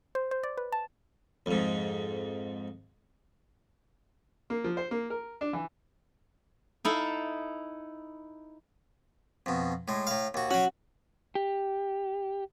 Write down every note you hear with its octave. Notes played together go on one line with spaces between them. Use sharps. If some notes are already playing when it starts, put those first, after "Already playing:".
C5
C5
D5
B4
A5
F2 G#2
A#3
F3
C5
A#3
A#4
D4
E3
D#4 E4 A4 F5
F2 B2
A2 G#3
A2 F5
D#2 F#4
F#3 C#4 F#4
G4